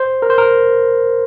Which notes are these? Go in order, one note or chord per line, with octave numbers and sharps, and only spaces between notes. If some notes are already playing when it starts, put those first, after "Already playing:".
Already playing: C5
A#4
C5
A#4